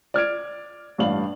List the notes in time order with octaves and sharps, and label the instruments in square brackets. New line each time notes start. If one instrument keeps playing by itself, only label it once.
[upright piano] D5 F6 G#6 D7
A1 G2 G3 D4 F5 F#7